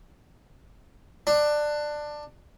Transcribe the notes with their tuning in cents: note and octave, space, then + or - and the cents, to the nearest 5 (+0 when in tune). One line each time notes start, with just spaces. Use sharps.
D4 +20